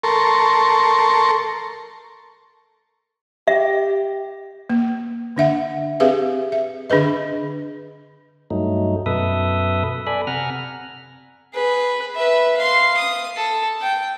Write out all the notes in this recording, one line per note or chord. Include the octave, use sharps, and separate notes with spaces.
A4 A#4 C6 C#6
G4 E5
A#3
D3 D4 E5 F#5
C4 G4 G#4 B4 E5 F5
E5
D3 D4 G#4 B4 D#5
G2 F#3 A3 D#4
F#2 B2 A4 B4 E5 D#6
A4 D5 G#5 B5
C3 F#5 G#5 A#5 F6
G#4 B4
B4 E5
F5 C6
D#6
A4
G5